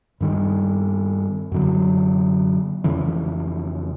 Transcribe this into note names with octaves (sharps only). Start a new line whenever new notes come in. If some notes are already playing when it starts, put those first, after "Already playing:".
G2 D#3 G3
F#2 D3 F#3
F2 C#3 E3